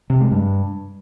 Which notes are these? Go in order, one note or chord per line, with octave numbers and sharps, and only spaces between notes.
C3
G#3
G2